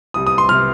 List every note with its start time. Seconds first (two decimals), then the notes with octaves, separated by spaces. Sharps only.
0.14 C2 C3 G3 D#6
0.27 D#6
0.38 C6
0.49 C3 G3 F6